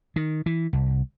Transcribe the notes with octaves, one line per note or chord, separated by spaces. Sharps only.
D#3
E3
C2